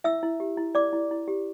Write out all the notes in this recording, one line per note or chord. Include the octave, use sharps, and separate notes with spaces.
E4 E5 E6
E4
G4
E4
E4 D5 D6
E4
E4
G4